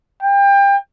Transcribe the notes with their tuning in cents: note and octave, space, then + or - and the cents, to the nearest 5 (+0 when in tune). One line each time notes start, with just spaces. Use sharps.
G5 +30